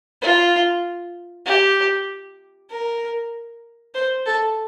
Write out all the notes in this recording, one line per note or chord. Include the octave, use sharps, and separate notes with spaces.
F4
G4
A#4
C5
A4